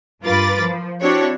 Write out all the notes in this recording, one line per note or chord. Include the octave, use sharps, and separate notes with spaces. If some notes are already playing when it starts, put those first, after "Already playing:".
G2 F4 A#4 B4 D6 A6
F3
C4 D4 E4 F#4 G4 C#5